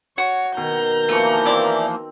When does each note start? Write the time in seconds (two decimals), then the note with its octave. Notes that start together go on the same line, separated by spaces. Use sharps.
0.18 F#4 C#5
0.57 B2 D#3 A#5 G6
1.09 E3 F3 A3 A#3 C#6
1.46 C4 E4 D5